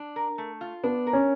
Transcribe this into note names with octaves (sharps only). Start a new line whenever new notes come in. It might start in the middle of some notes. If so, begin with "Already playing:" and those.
Already playing: D4
A#4
A3
F4
B3 D4
A#4
C#4